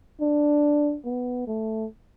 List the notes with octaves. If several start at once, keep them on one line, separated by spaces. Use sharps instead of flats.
D4
B3
A3